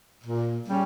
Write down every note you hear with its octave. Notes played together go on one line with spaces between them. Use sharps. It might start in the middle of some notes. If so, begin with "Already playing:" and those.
A#2
G3 C#4